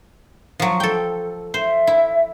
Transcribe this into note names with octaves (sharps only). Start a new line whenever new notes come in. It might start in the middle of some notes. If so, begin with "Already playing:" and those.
F3 F#3
A4 G5
C5 E5
E4